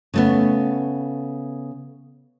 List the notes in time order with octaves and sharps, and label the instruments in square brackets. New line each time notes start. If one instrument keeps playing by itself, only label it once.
[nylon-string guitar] C#3 A3 B3